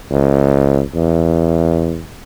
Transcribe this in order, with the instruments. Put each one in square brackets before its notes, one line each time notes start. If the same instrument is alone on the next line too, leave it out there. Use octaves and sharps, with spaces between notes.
[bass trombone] C#2
E2